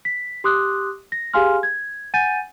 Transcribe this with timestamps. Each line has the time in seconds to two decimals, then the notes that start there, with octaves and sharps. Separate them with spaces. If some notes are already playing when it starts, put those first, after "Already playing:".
0.05 B6
0.44 G4 C6 D6 D#6 F#6
1.12 A#6
1.34 G4 G#4 F5 G#5 C6 F6
1.63 G#6
2.14 F#5 G#5 G6 A6 D#7